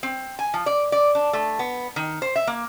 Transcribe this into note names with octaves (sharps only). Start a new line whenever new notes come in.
C4
G#5
F3
D5
D5
D4
A3
B3
D#3
C5
E5
A#3